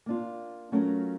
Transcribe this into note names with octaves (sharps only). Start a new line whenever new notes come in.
A#3 D4 F4
F#3 A3 C#4 F4 A#4